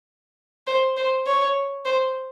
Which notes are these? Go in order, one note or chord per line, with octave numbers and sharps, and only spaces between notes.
C5
C5
C#5
C5